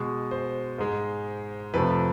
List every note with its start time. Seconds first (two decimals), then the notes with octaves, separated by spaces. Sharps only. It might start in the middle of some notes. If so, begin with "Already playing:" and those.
Already playing: B2 G#3
0.31 C5
0.78 G#2 G#3
1.74 F2 C3 F3 A3 B4